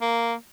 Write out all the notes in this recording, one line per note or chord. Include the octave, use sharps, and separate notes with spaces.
A#3